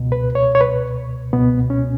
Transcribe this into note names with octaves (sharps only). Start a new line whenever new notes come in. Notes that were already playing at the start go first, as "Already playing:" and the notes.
Already playing: C#2 B2
B4
C#5
C#5
B4
C#2 B2 B3
C#4